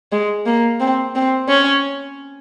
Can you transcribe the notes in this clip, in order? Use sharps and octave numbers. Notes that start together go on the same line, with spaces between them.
G#3
A#3
C4
C4
C#4